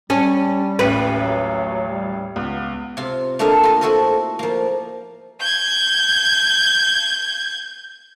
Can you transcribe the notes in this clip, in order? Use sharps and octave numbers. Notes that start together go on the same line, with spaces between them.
G3 C#4 A5
D#1 A1 C#4 B4
F#3
G3
C#2 B3
C3 F4
A3 A#3 D4 E4 D#5 F5
F4 D#5
E4 F#4 A4 C5 D#5
F3 A#3
G6 G#6